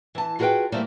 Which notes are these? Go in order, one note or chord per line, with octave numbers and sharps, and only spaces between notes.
E3 A5
F4 F#4 G#4 A#4 B4 G5
E3 G3 A3 A#3 C5